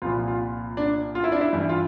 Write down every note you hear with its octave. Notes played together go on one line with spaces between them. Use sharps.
C2 A#2 F3 F4
F4
D4
F4
E4
D4
E4
G2 E3
F4